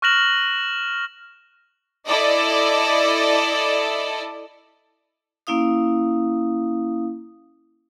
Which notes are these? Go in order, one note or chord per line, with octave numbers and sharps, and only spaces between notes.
C#6 F6 F#6 A#6 E7 F#7
E4 A4 D5 D#5
A#3 C#4 E4 F5 D#6